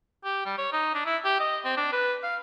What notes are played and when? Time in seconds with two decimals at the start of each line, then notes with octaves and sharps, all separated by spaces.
0.25 G4
0.45 G3
0.58 C#5
0.73 D#4
0.95 D4
1.06 E4
1.25 G4
1.40 D#5
1.65 C4
1.77 D4
1.93 B4
2.23 F5